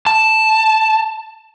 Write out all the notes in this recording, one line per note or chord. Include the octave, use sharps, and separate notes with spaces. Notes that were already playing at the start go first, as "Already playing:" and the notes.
A5